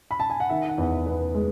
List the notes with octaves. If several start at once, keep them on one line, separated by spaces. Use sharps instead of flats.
B5
A5
G#5
F#5
D#3 E5
F#5
E2
B3
G#3